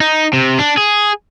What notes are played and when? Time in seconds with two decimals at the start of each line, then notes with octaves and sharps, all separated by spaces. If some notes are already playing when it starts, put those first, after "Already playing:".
0.01 D#4
0.33 C3
0.59 D4
0.77 G#4